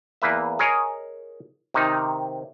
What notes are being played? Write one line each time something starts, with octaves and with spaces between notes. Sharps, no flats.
E2 A#3 B4 E5
G#4 A#4 C#5 D#5 G#5
C3 D#3 D#4